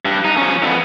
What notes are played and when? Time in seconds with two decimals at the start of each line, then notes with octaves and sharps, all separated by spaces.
0.05 G2
0.25 D#4
0.37 F3 C#4
0.62 F2 B3